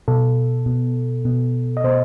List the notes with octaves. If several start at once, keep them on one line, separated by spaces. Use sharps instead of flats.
B2 A4
B2
B2
D#5
B2 C5